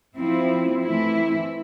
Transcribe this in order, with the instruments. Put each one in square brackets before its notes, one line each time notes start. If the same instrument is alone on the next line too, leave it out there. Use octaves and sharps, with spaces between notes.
[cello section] F3 C4 E4
E3 A3 C4 E4